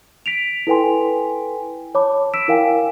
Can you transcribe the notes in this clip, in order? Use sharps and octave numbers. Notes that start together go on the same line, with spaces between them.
B6 D7 F7
E4 A4 B4 G5 G#5 C6
C#5 A5 B5 D6
E6 B6 D7 E7
E4 A#4 F5 G5 G#5